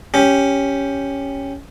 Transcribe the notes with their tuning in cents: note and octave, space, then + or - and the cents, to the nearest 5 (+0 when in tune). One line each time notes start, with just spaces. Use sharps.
C#4 +0 G4 +5